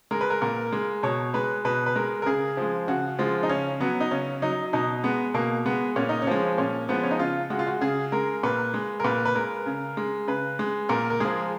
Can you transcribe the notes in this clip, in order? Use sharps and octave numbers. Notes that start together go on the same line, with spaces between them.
G#3 A#4
B4
A#4
A#2 A#4
G#3
B2 C#5
G#3 B4
B2 B4
B4
G#3 A#4
A#4
C#3 G#4
F3 G#3
C#3 F#4
F3 G#3 F4
D#4
C#3 C#4
F#3 B3
D#4
C#3 C#4
F#3 D#4
B2 D#4
G#3 B3
B2 A#3
G#3 B3
A#2 C#4
D#4
C#4
F3 G#3
A#2 C#4
F3 G#3 B3
C#4
D#4
C#3 F4
G#3 F#4
F4
F#4
C#3 G#4
G#3 A#4
A#2 B4
G#3
A#4
A#2 B4
B4
G#3 A#4
C#3
G#3
C#3 B4
G#3
A#2 A#4
A#4
F3 G#3 G#4